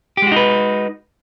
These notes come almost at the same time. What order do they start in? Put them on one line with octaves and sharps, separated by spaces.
G4 G#3 F#4 D#4 B4